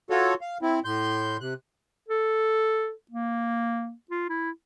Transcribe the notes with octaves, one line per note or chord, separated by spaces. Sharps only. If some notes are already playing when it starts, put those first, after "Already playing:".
F4 F#4 A4 C#5
F5
C4 E4
A2 C6 G6
C3 F#6
A4
A#3
F4
E4